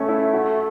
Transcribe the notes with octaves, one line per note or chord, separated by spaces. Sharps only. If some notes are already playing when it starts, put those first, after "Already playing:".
Already playing: A3 C#4
E4
F#4